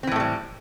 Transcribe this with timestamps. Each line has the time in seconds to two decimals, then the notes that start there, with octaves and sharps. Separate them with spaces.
0.03 C4
0.07 E3
0.12 A2
0.16 A3
0.20 G3